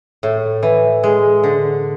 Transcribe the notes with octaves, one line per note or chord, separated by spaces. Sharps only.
A2
E3
G#3
D3